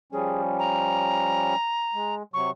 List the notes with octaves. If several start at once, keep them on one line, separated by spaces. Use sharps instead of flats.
F3 G3 C#4 G#4
A#5
G#3
C3 F#3 C#6